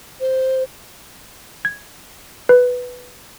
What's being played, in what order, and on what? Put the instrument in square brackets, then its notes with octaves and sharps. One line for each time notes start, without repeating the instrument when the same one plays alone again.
[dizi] C5
[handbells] G#6
B4